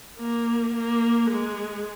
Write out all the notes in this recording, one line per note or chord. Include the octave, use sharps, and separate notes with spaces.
A#3
A#3
G#3